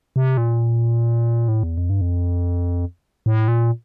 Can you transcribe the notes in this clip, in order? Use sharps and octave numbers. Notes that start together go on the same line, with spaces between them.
C3
A#2
A2
E2
F2
G2
F2
A2
A#2